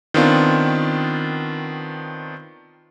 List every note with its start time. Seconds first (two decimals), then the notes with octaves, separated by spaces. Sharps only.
0.14 D#3 B3 C4 D4 F4